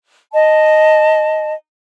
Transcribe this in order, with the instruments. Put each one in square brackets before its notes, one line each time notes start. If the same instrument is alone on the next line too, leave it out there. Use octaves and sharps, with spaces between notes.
[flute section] D#5 A5